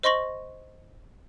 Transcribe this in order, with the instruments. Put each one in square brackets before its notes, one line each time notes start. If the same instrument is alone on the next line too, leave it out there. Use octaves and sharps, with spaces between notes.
[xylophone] C5 D#5 C6 C#6 A#6 F#7